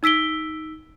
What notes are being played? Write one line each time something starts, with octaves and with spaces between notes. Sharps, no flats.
D#4 E6 B6 D7 G7